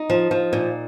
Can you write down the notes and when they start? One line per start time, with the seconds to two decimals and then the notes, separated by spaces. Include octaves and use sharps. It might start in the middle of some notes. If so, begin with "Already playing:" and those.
Already playing: D#4
0.10 F3
0.31 F3
0.53 A#2